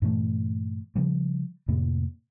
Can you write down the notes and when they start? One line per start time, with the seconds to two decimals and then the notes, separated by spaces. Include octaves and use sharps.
0.02 G2 A#2 E3 A3
0.96 C#3 F3 G3
1.68 F2 A2 C3 A#3